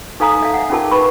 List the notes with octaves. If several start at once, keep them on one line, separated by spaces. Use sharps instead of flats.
D#4 A4 F5 G#5 A#5 D#6
E5 F5
E5 F#5
C#4 D#4 F4 G#4 A#4 A5
D#4 B4 B5 C#6